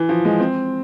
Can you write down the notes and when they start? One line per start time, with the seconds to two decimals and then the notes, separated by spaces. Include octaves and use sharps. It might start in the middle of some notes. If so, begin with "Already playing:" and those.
Already playing: E3
0.09 F3
0.25 G#3
0.40 C4